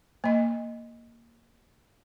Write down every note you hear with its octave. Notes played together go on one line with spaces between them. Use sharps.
A#3 D#5